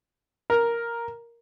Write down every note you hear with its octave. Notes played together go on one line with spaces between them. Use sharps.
A#4